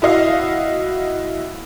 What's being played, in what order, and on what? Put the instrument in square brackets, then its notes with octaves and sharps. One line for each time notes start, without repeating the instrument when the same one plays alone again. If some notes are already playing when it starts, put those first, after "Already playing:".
[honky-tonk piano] E4 F#4 D#5 F5